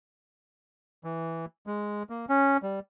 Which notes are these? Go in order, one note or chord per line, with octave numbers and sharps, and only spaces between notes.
E3
G#3
A#3
C#4
G3